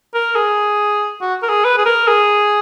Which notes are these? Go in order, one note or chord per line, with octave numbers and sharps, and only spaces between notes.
A#4
G#4
F#4
A#4
G#4
B4
G#4
A#4
G#4